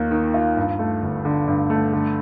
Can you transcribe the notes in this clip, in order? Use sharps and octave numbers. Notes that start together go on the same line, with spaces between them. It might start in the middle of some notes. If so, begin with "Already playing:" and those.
Already playing: D#2 D#3 A#3 F4
D#3
F4
G2
A3
G1
D3
G2
A3
D3